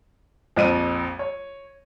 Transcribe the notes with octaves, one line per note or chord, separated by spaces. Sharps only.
A#1 F2 D#7
C#5